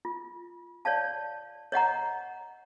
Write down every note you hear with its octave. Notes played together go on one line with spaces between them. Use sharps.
F4
C#5 D5 F5 A5
C#5 D#5 F#5 A#5